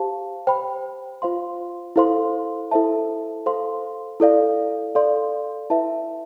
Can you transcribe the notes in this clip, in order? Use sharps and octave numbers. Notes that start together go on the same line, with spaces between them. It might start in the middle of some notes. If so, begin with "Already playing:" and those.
Already playing: G4 C5 F5 A5
C5 G5 B5
F4 C5 F5 C6
E4 A4 C5 F5 C6
E4 A4 C5 E5 A5
A4 C5 F5 C6
E4 A4 D5 F5
A4 D5 F5 C6
E4 B4 E5 A5